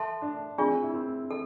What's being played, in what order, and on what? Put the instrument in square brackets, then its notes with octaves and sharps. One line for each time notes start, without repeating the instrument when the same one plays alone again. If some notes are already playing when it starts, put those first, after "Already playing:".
Already playing: [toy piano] A4 E5 A5 C6
[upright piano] D4
[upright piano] C4 [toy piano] D4 F4 G#4
[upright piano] E4
C4
[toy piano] A4